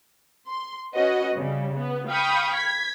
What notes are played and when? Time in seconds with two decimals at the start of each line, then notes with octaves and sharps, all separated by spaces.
0.47 C6
0.94 C#4 F#4 B4 D#5 F#5
1.34 C#3 G3
1.77 B3
2.09 F5 G5 B5 C#6 D#6 G6
2.53 G#6 B6